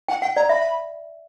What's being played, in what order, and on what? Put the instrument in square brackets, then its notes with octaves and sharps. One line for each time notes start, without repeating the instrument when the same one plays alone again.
[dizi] F#5 [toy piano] G5
[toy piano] F#5 [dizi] G5
[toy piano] D5 [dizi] A#5
[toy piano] E5 [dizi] B5